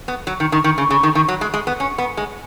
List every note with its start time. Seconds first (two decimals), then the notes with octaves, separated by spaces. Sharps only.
0.08 B3
0.27 F#3
0.40 D#3
0.52 D#3
0.64 D#3
0.78 C#3
0.90 C#3
1.03 D#3
1.15 D#3
1.28 F#3
1.41 G#3
1.54 G#3
1.67 B3
1.80 C#4
1.98 B3
2.17 G#3